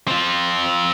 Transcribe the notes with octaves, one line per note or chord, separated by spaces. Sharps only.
C4 F4